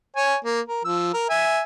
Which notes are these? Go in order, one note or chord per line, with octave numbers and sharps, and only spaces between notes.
C#5 G#5
A#3
A#4
F3 E6
A#4
E5 G#5